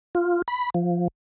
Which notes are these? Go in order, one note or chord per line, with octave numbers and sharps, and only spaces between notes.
F4
B5
F3